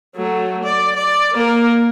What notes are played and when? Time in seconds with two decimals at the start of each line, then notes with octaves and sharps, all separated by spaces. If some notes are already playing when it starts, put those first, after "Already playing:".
0.16 F#3 A3
0.64 D5
0.96 D5
1.33 A#3 A#4